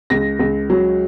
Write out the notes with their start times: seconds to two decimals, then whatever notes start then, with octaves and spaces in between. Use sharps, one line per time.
0.10 C#2 A#6
0.39 C#2
0.70 F#3